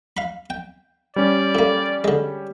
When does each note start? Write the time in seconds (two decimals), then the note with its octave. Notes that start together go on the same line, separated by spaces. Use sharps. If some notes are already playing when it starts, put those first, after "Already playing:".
0.17 F5 B5
0.50 G5
1.16 G3 C#4 D5
1.55 A2 A#3
2.04 D3 G#3